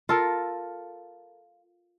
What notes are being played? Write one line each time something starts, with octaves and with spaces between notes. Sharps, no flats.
F4 A4 A#4